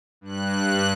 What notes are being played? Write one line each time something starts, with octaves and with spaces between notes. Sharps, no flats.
G2 F#6